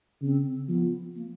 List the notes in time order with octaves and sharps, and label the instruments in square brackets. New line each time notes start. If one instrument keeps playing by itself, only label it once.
[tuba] C#3 [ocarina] C4
[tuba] F3 [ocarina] B3
[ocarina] A#3